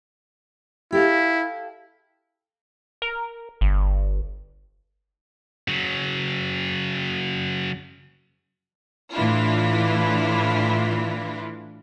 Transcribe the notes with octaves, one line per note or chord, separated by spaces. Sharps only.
E4 G4 A4 F5
A#4
G1
C#3 F#3
A2 E3 D4 E4 F4